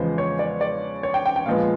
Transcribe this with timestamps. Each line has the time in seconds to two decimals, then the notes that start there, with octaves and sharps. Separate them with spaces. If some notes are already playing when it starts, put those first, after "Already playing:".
Already playing: E2 C#3 F3 G#3 B3 C5
0.18 C#5
0.39 D5
0.61 D5
1.03 C#5
1.14 G5
1.26 G5
1.36 G5
1.46 A#2 F3 G#3 B3 F5